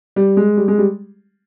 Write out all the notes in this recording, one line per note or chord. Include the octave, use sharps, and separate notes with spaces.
G3
G#3
G3
G#3
G3